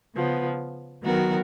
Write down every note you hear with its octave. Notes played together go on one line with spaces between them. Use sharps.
C#3 F3 B3
D#3 F#3 B3 F#4 A#4